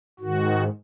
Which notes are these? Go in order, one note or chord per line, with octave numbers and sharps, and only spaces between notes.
G#2 D#3 F#4